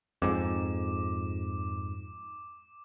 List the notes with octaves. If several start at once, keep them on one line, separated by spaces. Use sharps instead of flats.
F2 G#2 D6